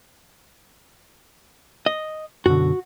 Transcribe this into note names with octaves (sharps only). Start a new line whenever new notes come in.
D#5
F#2 B2 D3 F#4